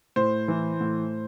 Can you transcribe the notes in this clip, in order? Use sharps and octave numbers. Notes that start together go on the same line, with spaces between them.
A2 C5
E3
A2